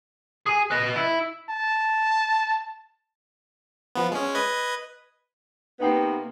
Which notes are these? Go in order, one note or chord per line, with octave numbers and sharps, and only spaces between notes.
G#4 G#5
B4 D#5
E4
A5
F3 B3
G#3 C#4
B4 D#5 G#6
C3 A#3 B3 D#4 G5 C7